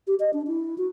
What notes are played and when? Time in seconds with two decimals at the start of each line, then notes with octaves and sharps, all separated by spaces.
0.07 G4
0.20 D#5
0.33 D4
0.47 E4
0.78 F#4